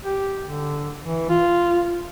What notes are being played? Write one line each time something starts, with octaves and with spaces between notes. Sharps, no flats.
G4
D3
E3
F4